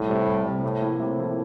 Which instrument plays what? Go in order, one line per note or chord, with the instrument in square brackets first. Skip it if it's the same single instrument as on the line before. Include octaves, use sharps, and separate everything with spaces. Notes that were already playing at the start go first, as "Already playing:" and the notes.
Already playing: [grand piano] C2 [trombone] A2
[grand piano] C3 G3
C2
C3 G3
[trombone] A2 [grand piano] C3
[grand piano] F3 A#3 E4
[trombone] A2 [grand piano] C3
[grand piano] F3 A#3 E4